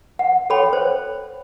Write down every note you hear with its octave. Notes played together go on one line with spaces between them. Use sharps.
F#5
A4 C#5 G5 B5
C5